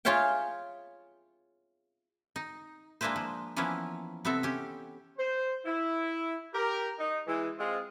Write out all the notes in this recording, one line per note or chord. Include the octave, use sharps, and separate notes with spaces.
F4 G#4 C#5 E5 F5 G5
D#4
G#3 A#3 D4 E4 B4 C5
F3
E3 F3 A#3 B3 C#4 E4
C3 B3 C4 A4 E5
C#4 G4
C5
E4
G4 A#4
D#4
E3 G#3
G#3 C4 F4